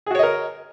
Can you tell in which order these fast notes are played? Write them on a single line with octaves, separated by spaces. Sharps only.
G#4 F#4 C#5 D#5 A#4